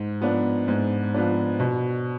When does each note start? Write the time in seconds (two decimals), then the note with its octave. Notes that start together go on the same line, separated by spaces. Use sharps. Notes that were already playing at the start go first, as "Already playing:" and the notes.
Already playing: G#2
0.21 F3 B3 D4
0.68 G#2
1.14 F3 B3 D4
1.60 B2